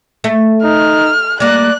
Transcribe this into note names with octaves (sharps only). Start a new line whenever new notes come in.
A3
D#4 F6
G3 A#3 D5 F#6